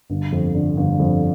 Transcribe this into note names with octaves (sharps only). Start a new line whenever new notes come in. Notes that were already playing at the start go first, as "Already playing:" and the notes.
G1
F2
D3
G1
F2